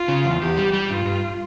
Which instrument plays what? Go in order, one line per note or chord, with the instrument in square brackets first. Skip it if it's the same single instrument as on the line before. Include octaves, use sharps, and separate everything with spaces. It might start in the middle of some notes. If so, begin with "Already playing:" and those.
Already playing: [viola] F4
[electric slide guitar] C#3
E2
[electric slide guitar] E2 [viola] G4
[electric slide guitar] G3
G3
[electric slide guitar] G2 [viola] F4
[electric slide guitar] G2